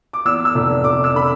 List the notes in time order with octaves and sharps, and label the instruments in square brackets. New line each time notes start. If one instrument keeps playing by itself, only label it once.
[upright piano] D6
E2 E6
E6
F1
F1 D6
E6
D3 B5